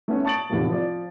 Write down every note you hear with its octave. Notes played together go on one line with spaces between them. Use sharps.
A3 B3 C#4
A5 C#6 D#6 A6 D7 F#7
E2 A2 C3 D#3 F3 A#3
F3 D5